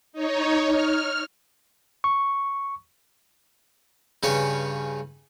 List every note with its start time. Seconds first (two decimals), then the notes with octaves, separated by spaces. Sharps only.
0.13 D#4 C#5
0.69 F6
2.04 C#6
4.23 G2 C#3 C#4 B4 C#5